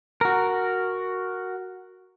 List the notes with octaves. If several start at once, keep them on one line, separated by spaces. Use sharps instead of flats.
F#4 A#4